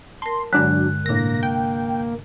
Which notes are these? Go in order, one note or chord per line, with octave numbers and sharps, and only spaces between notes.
A#4 A5 C6
G2 D3 F#3 G#3 D4 F#6
A2 C3 A#3 D4 A#6
G5